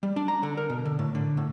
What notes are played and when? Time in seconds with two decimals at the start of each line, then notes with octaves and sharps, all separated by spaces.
0.03 G3
0.16 D4
0.28 A#5
0.43 D3
0.57 A#4
0.70 B2
0.85 D3
0.99 A2
1.15 D3
1.37 A2